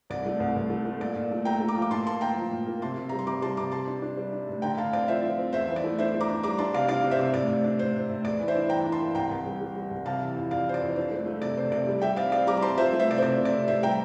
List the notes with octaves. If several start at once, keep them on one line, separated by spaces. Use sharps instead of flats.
C2 D5
A3
C2
C2
A3
A3
A#2 D5
A#2
A3
A3 G5 A#5
A3
A#5 D6
F3
D6
A#2 A5 C6
A#3 A5 C6
A#2 G5 A#5
F3
A#2
A#3
C3 A5 C6
C3
G3 A#5
C6
C3 A#5 D6
G3 A5 C6
C3 A#5 D6
G3 A5 C6
D4
D4
G3
D4
A2
D3 G5 A#5
D3 F5 A5
C4 D5 F5
F3 C5 E5
F3
C4
E2 C5 E5
E3
D5
A3
D4 C5 E5
A3
A#5 D6
D4
G3 A#5 D6
D4 A5 C6
C3 D5 F5
D4 D5 F5
C3
C5 E5
C3
A2 D5
A2
D4
A2 C5
A2
A2
E2 D5
E3
C5 E5
D4
E3 G5 A#5
D4
A5 C6
A#3
C2 G5 A#5
C2
G3
G3
G3
C2
C3 F5 A5
E3
F2
F2 D5 F5
E3 C5
D5
F2
D4 C5
A3
A3
C3 D5
C3 C5
C3 D5
G3
G3 E5 G5
C4 D5 F5
C4 D5 F5
G3 A#5 D6
A#5
C4 A5 C6
F3 C5 E5
A3
C5 E5
C3 D5
C5
C3 D5
C3
D5
C3
A2 C5 E5
G3 G5 A#5